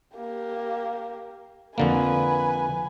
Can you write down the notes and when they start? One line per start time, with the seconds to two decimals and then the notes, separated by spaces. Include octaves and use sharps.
0.16 A#3 G4
1.78 F2 D3 A#3 B4 G#5